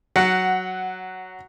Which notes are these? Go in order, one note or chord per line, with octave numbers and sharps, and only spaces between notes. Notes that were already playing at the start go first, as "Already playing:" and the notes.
F#3 F#5